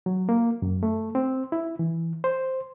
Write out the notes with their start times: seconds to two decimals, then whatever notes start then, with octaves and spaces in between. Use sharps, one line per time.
0.06 F#3
0.29 A#3
0.62 F#2
0.83 A3
1.15 C4
1.52 E4
1.79 E3
2.24 C5